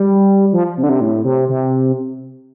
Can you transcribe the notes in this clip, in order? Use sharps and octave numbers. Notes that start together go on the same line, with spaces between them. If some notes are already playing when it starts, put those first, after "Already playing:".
Already playing: G3
F3
C3
D3
C3
A2
C3
C3